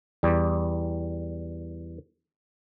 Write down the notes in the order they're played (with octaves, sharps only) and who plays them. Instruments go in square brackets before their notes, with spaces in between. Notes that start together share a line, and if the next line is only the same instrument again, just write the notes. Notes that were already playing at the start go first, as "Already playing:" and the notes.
[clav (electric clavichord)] E2 G3